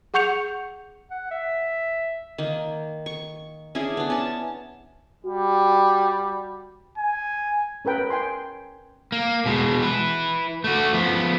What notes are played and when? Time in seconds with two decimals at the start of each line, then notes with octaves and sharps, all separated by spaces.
0.14 G#4 F#5 C#6 G6 C#7 F7
1.11 F#5
1.31 E5
2.38 D#3 A#3
3.06 C#6
3.75 C#4 D4 E4 G#4
3.97 B3 D4
4.10 C#4 A5
5.25 G3 F#4
6.98 G#5
7.85 C#4 A#4 B4 G5
8.10 G5 G#5 C6
9.12 A#3
9.46 B2 G#3
9.83 E4 B4
10.64 A3 F#4
10.93 F3 B3